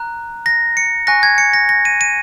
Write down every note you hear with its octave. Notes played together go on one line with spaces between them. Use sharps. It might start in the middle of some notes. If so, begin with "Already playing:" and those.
Already playing: A#5 F#6
A#6
C#7
G#5 C#6 F#6 A#6
G#6
C#7
A#6
A#6
D#7
D#7